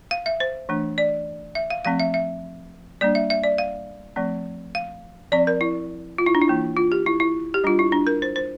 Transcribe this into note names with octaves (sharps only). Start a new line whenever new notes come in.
F5
E5
C5
E3 A3 D4
D5
E5
F5
F3 A3 C4 F5
E5
E5
G3 A#3 D4 D5
E5
E5
D5
F5
F3 A3 C4
F5
F3 C4 D5
A#4
E4
F4
E4
D4
E4
E3 A#3 D4
F4
G4
E4
E4
G4
G3 D4 F4
E4
D4
A#4
C5
C5